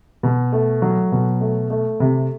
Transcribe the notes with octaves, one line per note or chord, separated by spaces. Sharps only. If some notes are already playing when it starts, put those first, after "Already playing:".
B2
A3
F#3
B2
A3
A3
C3